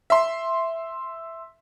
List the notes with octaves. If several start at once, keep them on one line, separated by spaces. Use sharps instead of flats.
E5 C6